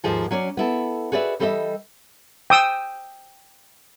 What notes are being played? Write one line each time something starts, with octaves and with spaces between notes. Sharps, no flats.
D#2 G#2 F3 G#4 A4
F#3 C#4 C#5 D5
B3 E4 A4
F#4 G#4 B4 D5 E5
E3 G3 A4 B4 D#5 E5
G5 D#6 E6